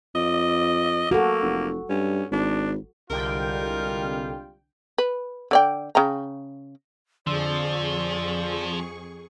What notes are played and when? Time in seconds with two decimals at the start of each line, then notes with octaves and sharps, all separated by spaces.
0.15 F2 D#5
1.11 A#3 F#4 A4
1.42 F1
1.90 G2 C#4
2.32 G#1 D4
3.10 C2 D3 G3 G#3 F4 A#4 G5
4.98 B4
5.51 D3 D5 G5
5.95 C#3 G5 A#5
7.27 F2 D3 F3 G#4 D5 C6 C#6 E6